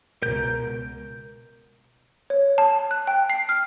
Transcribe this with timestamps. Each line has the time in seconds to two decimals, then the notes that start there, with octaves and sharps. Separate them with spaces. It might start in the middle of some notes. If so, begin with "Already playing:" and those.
0.22 C#2 B2 A#4 G6
2.30 C#5
2.58 A5
2.91 F#6
3.07 G5
3.30 C7
3.49 F6